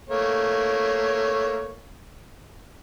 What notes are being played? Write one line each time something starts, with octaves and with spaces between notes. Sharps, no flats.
A3 A#3 C#5